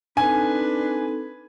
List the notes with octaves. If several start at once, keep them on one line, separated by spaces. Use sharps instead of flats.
C4 D4 D#4 A4 B4 G#5